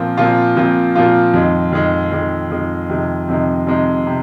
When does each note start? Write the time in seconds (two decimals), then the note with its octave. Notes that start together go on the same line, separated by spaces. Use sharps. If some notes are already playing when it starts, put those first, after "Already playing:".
Already playing: A#2 F3 C4 F4
0.17 A#2 F3 C4 F4
0.56 A#2 F3 C4 F4
0.95 A#2 F3 C4 F4
1.34 F2 D#3 G#3
1.73 F2 D#3 G#3
2.11 F2 D#3 G#3
2.51 F2 D#3 G#3
2.90 F2 C3 D#3 G#3
3.28 F2 C3 D#3 G#3
3.67 F2 C3 D#3 G#3
4.07 C3